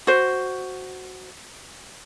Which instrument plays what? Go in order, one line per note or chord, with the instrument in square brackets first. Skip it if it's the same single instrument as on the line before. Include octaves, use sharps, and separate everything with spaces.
[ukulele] F#4 C5